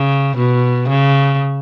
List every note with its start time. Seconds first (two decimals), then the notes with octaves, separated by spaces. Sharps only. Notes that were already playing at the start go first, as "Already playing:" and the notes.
Already playing: C#3
0.37 B2
0.89 C#3